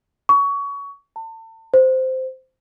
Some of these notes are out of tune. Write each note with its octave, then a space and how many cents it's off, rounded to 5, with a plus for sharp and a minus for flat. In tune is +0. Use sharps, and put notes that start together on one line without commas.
C#6 +25
A5 +35
C5 -10